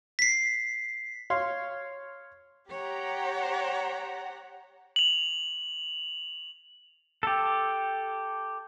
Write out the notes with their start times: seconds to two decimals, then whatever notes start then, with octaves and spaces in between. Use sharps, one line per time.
0.19 B6 C7
1.30 C#5 F5 C6
2.70 G4 C#5 F#5 A#5
4.96 F7 F#7
7.23 G4 A4